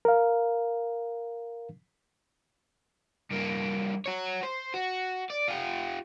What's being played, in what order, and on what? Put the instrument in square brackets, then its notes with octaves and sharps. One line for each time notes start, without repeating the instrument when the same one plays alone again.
[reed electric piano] A#4 F5
[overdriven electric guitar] G2 A#3
F#4 C#5
C5
F#4
D5
F4 G4